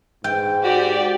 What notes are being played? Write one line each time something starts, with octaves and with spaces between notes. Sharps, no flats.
G#2 G5
F#4 G4 D5